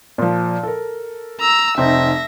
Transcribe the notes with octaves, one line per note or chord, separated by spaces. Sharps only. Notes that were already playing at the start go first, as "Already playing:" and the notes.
A#2 F3
A4 A#4
A#5 E6
F1 C4 D#4 E5 A#6